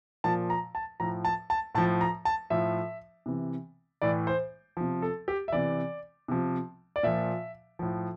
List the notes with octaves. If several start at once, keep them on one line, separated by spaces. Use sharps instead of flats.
A#2 F3 A5
A#5
A5
A2 F3 A#5
A5
A5
A2 F3 A5
A#5
A5
A2 F3 E5
C3 E3
A2 E3 D5
C5
C3 F3
A4
G4
E5
C3 E3 D5
C3 F3
D5
A#2 F3 E5
A2 F3